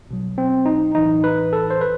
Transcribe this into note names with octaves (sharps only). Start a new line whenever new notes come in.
B1 B2 F#3
C4
D#4
B1 A2 E3 D#4
B4
A4
C5
B4